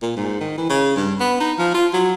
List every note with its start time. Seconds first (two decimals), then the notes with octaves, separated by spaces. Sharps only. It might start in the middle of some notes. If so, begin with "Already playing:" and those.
0.02 A#2
0.16 G#2
0.40 D#3
0.58 E3
0.70 C#3
0.96 G2
1.20 B3
1.40 D#4
1.58 F3
1.74 F4
1.93 F#3